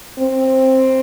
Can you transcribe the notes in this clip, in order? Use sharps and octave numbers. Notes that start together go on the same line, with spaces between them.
C4